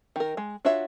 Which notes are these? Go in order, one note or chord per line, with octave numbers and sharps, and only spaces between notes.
D#3 A#4
G#3
D4 F4 F#4 C#5 E5